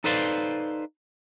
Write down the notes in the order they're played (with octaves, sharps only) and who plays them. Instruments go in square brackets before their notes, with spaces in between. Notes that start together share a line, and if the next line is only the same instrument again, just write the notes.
[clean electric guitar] D#4 A4 B4 C5 D5 F5